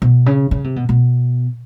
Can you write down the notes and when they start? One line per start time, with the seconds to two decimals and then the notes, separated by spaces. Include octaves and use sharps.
0.02 B2
0.26 C#3
0.51 C#3
0.64 C3
0.76 B2
0.89 B2